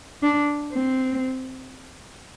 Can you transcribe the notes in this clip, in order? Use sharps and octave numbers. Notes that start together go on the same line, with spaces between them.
D4
C4